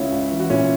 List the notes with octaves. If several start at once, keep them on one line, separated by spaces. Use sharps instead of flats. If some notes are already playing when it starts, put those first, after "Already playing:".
Already playing: C#2 C#3 C#4 E4
C#2
E3
F#4
A#2 C#4 E4